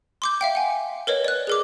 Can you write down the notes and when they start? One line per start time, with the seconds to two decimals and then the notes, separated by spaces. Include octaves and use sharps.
0.22 C6 D6 G6
0.41 E5 F5 G5
0.55 F#5 G#5
1.07 A#4 B4 C#5 D#5
1.24 D5 F#6
1.47 G#4 A#4 D6